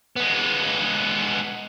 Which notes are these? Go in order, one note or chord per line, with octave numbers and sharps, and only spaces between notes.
G#3 B3